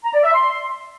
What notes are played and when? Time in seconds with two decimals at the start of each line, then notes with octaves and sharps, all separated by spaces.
0.04 A#5
0.14 D5
0.24 E5
0.33 C6